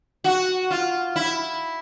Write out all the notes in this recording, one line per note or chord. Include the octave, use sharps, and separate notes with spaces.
F#4
F4
E4